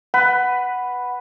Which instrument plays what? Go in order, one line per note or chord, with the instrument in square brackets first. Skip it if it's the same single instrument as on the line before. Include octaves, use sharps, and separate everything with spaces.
[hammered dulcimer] B4 [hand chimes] F#5